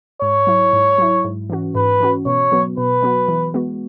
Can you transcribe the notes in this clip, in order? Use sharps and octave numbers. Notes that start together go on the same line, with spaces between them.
G#2 C#5
F#3 E4
G#2
F#3 E4
G#2
E3 C#4 F#4
G#2 B4
E3 C#4 F#4
B2 C#5
F#3 B3 F#4
B2 B4
F#3 B3 F#4
E3
G#3 B3 F#4